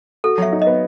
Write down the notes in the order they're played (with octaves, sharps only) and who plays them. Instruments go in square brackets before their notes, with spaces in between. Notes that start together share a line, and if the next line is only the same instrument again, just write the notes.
[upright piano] F#4 [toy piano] A4
[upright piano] F#3 [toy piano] E5
[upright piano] D#4
[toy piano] D#5
[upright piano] B3